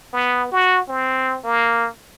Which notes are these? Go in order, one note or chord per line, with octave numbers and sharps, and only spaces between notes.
B3
F#4
C4
A#3